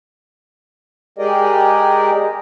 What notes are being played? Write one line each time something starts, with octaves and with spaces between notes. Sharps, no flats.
G#3 G4 G#4 A#4 D5 D#5